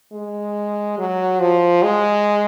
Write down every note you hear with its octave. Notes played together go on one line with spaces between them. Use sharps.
G#3
F#3
F3
G#3